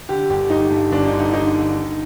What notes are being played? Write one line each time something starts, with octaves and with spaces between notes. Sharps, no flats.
D3 G4
G1 G4
G1 D#4
G2
G1 D4
D#4
D3
D#4
D3 D#4
D3
D#3